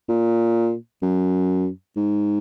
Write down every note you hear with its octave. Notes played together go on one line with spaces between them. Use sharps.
A#2
F#2
G#2